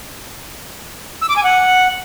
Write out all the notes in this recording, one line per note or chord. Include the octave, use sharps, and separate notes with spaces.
E6
D6
G#5
F#5